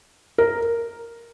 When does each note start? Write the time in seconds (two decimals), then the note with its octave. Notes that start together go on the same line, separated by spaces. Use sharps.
0.38 A#4